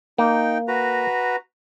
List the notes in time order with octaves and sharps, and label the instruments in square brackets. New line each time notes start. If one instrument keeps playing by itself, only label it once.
[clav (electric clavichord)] A#3 [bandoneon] D#4 G5
[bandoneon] F#4 B4 A#5